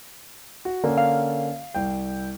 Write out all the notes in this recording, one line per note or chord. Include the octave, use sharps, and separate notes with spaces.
F#4
D3 A#3 C#4
F5
C2 G5